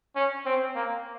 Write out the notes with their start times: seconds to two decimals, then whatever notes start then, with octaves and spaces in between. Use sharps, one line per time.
0.15 C#4
0.45 C4
0.75 A#3